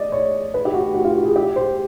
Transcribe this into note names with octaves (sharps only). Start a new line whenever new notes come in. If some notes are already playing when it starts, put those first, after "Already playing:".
Already playing: D5 D#5
C#5
B4
G4
F#4
F#4
F4
F#4
G#4
G4
C5